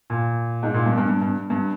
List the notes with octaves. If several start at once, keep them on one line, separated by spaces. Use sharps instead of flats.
A#2
G#2
A#2
G2
G2
G2
G2
G2